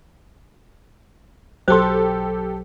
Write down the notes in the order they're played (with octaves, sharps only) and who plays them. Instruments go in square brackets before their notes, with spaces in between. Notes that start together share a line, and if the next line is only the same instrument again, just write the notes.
[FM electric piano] B1 F#3 [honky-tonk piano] G4 A4 [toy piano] C5 C6